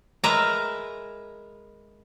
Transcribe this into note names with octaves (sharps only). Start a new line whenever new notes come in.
G#3 A#4 B4 E5 A#5